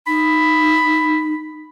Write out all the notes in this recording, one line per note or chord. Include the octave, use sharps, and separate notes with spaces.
D#4 B5